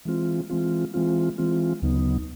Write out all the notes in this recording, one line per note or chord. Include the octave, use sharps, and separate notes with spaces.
E3 G#3 C4 F4
E3 G#3 C4 F4
E3 G#3 C4 F4
E3 G#3 C4 F4
D2 C#3 F#3 B3 D#4